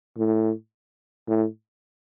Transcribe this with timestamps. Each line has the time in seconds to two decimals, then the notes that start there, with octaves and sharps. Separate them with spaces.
0.18 A2
1.28 A2